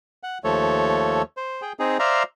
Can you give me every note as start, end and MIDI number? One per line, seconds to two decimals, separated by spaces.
0.23 0.38 78
0.44 1.22 39
0.44 1.22 53
0.44 1.22 57
0.44 1.22 69
0.44 1.22 73
1.37 1.62 72
1.62 1.73 68
1.62 1.73 79
1.79 1.97 60
1.79 1.97 63
1.79 1.97 68
1.99 2.23 72
1.99 2.23 74
1.99 2.23 76
1.99 2.23 77
1.99 2.23 82